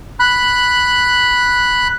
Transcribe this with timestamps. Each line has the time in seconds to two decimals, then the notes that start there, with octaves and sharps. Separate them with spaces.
0.20 B5 F#6